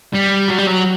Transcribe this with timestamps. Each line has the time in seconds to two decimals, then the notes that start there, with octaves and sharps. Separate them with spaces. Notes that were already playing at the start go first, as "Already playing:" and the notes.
0.15 G3
0.48 F#3
0.59 G3
0.67 F#3